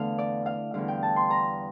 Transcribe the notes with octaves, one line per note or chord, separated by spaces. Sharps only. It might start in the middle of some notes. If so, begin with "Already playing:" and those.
Already playing: E2 D3 A3 F5
D5
F5
E2 D3 G3 F5
G5
A5
C6
A#5